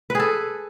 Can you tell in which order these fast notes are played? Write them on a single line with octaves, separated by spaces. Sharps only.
B4 G#4 A4